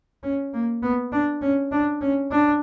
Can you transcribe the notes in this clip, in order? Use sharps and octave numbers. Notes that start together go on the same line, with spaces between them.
C#4
A#3
B3
D4
C#4
D4
C#4
D4